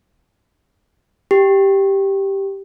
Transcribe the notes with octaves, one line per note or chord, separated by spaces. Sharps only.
G4